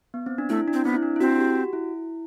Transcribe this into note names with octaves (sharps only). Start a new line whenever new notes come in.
B3
C4
D4
A3 E4
D4
C4
B3 C4
E4
D4
E4
C4 F#4
G4
F#4
E4